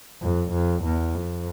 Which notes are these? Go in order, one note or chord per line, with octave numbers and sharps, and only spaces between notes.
F2
F2
E2
F2